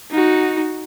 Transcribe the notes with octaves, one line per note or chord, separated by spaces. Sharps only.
D#4 F#4